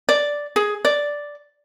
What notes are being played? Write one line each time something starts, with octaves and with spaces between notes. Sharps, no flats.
D5
G#4
D5